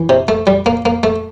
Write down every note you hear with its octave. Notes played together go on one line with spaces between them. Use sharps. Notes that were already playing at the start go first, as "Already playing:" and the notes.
Already playing: E3
C3
A3
G3
A#3
A#3
A3